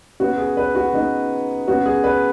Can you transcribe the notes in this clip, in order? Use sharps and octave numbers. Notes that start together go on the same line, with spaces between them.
C#3 B3 F#4
G#4
B4
F#4
C#3 B3 D#4
C#3 B3 F#4
G#4
B4